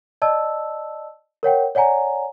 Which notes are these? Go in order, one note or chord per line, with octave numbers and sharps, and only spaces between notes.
D5 D#5 A5 E6
A#4 C#5 F#5 G5
C#5 D5 F#5 G#5 A#5